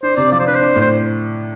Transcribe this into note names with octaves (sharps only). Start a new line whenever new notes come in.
D4 C5
C3 D5
F3 D5
C5
D4 B4
C5
D4
A2
C5